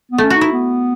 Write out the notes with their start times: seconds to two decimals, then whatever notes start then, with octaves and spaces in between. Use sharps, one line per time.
0.11 B3
0.18 A3
0.24 C#4
0.30 F#4
0.36 D#4
0.41 E4
0.52 B3